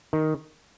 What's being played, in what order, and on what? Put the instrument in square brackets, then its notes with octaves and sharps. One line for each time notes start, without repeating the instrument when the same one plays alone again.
[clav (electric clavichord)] D#3